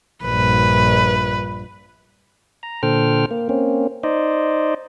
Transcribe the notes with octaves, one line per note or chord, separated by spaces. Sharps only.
A#1 G2 B4
A#5
A#2 D3 A4 C5 G5 F6
A#3
A#3 C4 C#4
D#4 C5 D5 D#5